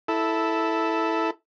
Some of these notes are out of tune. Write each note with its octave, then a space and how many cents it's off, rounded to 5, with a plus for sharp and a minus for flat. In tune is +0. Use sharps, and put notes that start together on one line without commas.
E4 -5 A4 +0